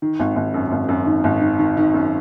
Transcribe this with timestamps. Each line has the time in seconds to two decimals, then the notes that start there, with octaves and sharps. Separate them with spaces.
0.02 D#3
0.19 G#1
0.36 G#1
0.54 F#2
0.72 G#1
0.89 F#2
1.06 D#3
1.24 G#1
1.41 D#3
1.59 D#3
1.77 D#3
1.94 F#2